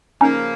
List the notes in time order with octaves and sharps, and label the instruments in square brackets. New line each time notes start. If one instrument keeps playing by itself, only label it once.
[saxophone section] C#3 F3 A#3 [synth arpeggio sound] C#4 D#4